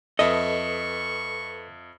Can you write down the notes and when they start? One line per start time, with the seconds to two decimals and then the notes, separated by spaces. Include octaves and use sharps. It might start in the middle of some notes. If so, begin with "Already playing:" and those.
0.19 F2 A4 B4 D#5 E5 C#6 D#6